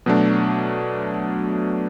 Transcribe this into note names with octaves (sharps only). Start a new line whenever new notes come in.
B2 F#3 A3 D4